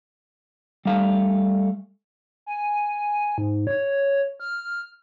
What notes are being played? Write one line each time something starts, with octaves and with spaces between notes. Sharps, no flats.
G3 A3 F5
G#5
G#2
C#5
F6